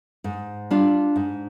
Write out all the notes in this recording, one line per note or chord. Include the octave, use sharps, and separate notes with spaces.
G#2
G3 D4 F4
G#2